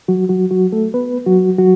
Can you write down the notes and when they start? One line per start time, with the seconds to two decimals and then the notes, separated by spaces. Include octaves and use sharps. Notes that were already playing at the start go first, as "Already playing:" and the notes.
0.08 F#3 F#4
0.29 F#3 F#4
0.51 F#3 F#4
0.72 A3 A4
0.94 B3 B4
1.26 F#3 F#4
1.58 F#3 F#4